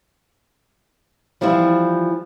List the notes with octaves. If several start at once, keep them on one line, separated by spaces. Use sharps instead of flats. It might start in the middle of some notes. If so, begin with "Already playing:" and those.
E3 F3 G3 C4 E4 F4